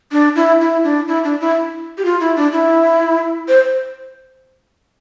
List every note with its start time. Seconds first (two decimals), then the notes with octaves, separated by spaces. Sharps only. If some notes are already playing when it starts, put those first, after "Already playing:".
0.12 D4
0.36 E4
0.61 E4
0.84 D4
1.08 E4
1.24 D4
1.40 E4
1.97 G4
2.05 F4
2.20 E4
2.36 D4
2.52 E4
3.48 C5